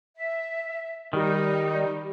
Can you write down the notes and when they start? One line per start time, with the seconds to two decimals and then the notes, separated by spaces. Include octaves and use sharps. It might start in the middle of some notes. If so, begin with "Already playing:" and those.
0.16 E5
1.13 D#3 G3 D#4